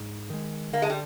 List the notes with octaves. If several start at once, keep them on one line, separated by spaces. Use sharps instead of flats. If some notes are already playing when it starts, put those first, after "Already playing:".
Already playing: G#2
D#3 G#3
D3 A#3
G#3
G3